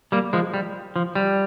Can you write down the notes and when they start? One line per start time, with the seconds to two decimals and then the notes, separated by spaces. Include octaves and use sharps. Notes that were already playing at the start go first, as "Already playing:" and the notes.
0.12 G3 A#3
0.33 F3 G#3
0.54 G3
0.96 F3
1.15 G3